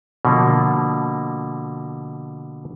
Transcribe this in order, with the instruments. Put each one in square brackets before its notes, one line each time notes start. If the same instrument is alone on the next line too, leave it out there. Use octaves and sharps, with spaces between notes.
[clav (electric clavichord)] B2 D3 F3 A#3